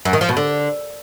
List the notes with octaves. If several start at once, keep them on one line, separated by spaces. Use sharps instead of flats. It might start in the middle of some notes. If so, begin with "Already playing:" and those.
F#2
D#3
F3
B2
D3